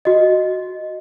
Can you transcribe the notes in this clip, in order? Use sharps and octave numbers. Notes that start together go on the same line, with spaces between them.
F#4 D#5